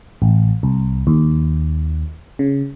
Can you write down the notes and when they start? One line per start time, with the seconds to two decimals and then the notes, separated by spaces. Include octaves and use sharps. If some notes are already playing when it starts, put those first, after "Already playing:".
0.22 A1
0.63 C2
1.07 D#2
2.39 C#3